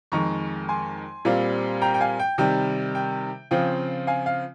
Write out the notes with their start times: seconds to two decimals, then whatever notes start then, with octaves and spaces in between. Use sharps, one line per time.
0.12 F2 D#3 G#3 A#5 C#6
0.69 G#5 C6
1.25 A#2 G3 C4 F4
1.82 G5 A#5
1.94 G5
2.01 F5 G#5
2.19 G5
2.38 C3 D#3 G3 G5
2.95 G5
3.51 C#3 F3 C4 F4 G5
4.07 F5 G#5
4.26 F5